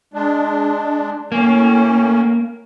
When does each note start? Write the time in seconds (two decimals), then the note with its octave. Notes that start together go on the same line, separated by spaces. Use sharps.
0.14 G#3 D4
1.32 A2 A#3 C#4